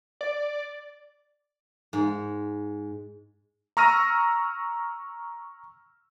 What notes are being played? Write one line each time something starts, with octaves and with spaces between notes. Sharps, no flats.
D5
G#2
A#5 C#6 E6 F6 A#6 D#7